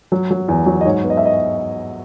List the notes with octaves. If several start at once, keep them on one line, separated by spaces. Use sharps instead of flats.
F#3
F#3
E2
F#3
D#5
G#2 C#5
B3
D#5
E5
D#5